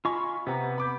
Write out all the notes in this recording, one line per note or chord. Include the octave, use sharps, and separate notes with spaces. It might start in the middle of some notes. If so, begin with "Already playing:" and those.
F4 D#5 G#5 B5 C#6
C3 B3 F#5 A#5
B5 D6 G6